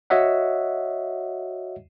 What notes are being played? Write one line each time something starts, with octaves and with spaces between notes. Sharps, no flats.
F#4 C#5 D#5 E5 F#5